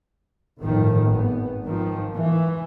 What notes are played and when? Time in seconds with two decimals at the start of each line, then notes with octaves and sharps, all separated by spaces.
0.61 G1 A2 D#3 F3
1.04 G#1 B3
1.64 G#2 D#3 F3
2.16 E3